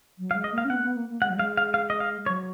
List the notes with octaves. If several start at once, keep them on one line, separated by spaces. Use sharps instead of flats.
F#3
F5
G#3
D#5
A#3 F5
C#4
B3 F#5
A#3
B3
A#3
A#3
G#3 F#5
F#3
G#3 F5
F5
F5
D#5
F5
F#3 C#5